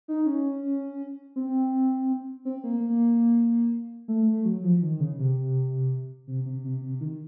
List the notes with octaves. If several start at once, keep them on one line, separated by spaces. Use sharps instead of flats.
D#4
C#4
C4
C4
A#3
A#3
A3
A3
F#3
F3
D#3
C#3
C3
C3
C3
C3
C3
D#3